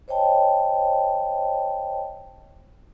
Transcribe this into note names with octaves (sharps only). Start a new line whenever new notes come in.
C5 C#5 D#5 G5 A5